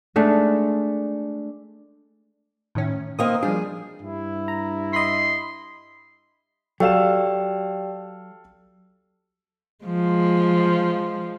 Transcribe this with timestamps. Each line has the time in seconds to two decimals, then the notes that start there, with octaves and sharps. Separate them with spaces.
0.16 G#3 A3 D4
2.75 A2 D#3 C#4
3.19 D#3 A#3 C4 D#6
3.43 F3 G3 D4 G#4
4.02 G2 E4
4.48 A#5
4.93 D#5 B5 C6 B6
6.80 F#3 G4 A4 D5 F5 G5 E7
9.84 F3 G#3